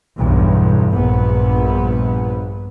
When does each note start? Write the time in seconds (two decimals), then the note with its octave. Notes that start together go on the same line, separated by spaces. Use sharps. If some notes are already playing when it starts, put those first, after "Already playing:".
0.15 B1 E2 G2
0.92 A#1 G2 A#2 B3